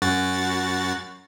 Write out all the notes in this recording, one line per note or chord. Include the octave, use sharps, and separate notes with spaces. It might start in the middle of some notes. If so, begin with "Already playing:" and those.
F#2 F#4 A6